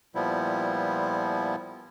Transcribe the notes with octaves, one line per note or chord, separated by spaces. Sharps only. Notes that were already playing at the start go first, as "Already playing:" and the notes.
A#2 F3 G3 B3 E4